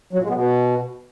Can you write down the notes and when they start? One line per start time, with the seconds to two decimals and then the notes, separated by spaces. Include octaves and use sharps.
0.13 F#3
0.19 A#2
0.24 G#3
0.30 B3
0.35 B2